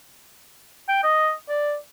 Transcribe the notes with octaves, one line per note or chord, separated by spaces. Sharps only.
G5
D#5
D5